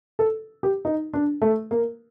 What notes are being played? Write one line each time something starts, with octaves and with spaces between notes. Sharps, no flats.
A4
G4
D#4
D4
A3
A#3